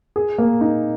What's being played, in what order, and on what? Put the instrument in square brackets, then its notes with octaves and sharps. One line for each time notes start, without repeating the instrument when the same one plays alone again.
[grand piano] G#4
A#3
D#4